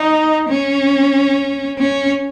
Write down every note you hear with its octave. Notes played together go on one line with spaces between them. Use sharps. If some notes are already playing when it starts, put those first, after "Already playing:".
Already playing: D#4
C#4
C#4